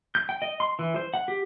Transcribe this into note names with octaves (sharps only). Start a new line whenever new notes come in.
G6
G5
D#5
C6
E3
C5
F#5
G4